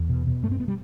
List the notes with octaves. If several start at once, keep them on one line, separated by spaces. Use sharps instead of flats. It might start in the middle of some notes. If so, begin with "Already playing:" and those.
Already playing: E2
B2
B2
G2 A3
C4
B3
G3